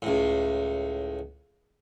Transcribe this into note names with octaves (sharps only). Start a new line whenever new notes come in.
C#2 A2